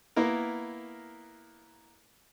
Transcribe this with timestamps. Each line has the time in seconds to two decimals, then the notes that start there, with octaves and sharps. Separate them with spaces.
0.16 A#3 B3 E4 A#4